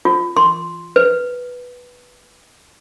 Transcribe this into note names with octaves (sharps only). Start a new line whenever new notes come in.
F4
C6
B4